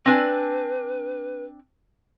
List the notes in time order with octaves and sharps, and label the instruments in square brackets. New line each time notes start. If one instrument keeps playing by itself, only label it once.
[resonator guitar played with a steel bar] C4 D4 G#5 [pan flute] B4